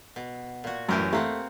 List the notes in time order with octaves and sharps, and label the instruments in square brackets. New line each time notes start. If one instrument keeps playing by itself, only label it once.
[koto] B2
A#2 F#4
[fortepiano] A1 F#2 [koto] E3 G4 A#4
[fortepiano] A3 [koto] A#3 C4 F#5